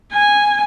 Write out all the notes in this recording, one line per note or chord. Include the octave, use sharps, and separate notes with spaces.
G#5